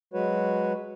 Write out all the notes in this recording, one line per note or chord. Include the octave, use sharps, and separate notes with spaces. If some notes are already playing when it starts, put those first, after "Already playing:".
F#3 G#3 F#4 B4 C#5